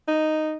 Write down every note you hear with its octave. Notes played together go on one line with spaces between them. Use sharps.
D#4